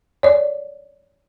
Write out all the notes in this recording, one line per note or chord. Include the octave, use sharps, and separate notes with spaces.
C#5 D5